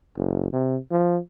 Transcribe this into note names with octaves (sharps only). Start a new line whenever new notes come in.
F#1
C3
F3